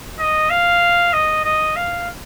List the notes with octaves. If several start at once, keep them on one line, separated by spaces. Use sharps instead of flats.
D#5
F5
D#5
D#5
F5